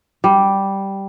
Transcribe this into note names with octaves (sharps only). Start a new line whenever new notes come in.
G3